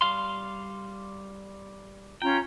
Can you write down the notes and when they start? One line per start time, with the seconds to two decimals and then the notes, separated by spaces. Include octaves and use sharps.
0.01 G3 F5 C6
2.22 C#4 F4 G5 A#5